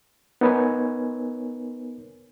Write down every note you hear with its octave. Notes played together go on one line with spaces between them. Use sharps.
B3 D#4 A#4 B4 C#5 G#5